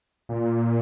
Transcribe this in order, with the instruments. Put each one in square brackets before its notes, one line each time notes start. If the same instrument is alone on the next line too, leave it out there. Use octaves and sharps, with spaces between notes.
[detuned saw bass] A#2